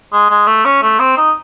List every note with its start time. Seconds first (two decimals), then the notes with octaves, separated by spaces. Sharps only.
0.12 G#3
0.30 G#3
0.47 A3
0.65 C#4
0.82 A3
0.99 C4
1.17 D#4